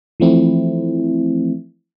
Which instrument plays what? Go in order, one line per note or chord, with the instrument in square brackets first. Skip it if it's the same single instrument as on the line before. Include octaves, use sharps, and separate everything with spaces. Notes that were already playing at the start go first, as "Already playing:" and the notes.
[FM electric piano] E3 F3 A3 C4 E4